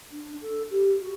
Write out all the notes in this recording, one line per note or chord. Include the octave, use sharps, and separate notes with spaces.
D4
A4
G4
F#4